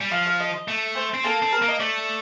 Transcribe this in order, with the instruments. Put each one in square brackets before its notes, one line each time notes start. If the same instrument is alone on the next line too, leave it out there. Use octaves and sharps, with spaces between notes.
[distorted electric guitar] G3
[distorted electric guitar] F3 [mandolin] F5
[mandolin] F5
D#5
D#5
[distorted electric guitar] A3
[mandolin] C5
[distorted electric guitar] C4
[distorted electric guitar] A#3 [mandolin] A4
[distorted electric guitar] C4
[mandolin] A#4
[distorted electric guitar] A#3
[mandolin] D#5
[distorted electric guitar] A3 [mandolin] D5